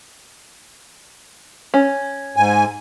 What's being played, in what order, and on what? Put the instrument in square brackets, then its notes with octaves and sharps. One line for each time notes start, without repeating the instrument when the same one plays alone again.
[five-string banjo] C#4
[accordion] G#2 G#5